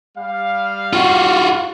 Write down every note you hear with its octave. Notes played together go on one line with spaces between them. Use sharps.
G3 F5
F4 F#4